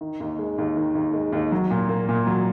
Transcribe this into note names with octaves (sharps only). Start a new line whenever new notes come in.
D#3
D#2
G#3
D#2
D#3
D#2
G#3
D#2
F#3
A#2
A#3
A#2
F#3